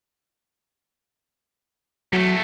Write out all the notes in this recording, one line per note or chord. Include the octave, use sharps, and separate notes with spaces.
E2 F#3 A3